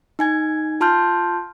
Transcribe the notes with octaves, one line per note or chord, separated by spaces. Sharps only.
D#4 G#5 G#6
F4 A5 C6 F6 G6